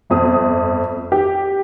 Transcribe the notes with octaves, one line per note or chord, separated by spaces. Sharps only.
G1 F2 D#6
G4